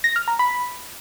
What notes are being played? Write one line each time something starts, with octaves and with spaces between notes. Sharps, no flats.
A#6
F6
A#5
B5